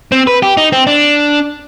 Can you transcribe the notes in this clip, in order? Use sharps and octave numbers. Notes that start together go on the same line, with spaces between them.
C4
B4
G4
D#4
C4
D4